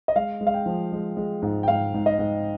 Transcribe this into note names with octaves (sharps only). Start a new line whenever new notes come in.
D#5
G#3 F5
G#3
F5
G5
F3
G#3
G#3
G#2
G5
G#2 F5
G#2
D#5
G#2